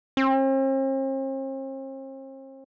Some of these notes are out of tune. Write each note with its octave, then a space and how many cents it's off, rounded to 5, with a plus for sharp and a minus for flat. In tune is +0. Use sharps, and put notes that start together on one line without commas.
C4 +45